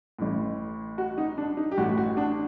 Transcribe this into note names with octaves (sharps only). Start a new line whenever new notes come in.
A1 A2
F#4
D#4
D4
D#4
G4
A1 A2 F#4
F#4
D4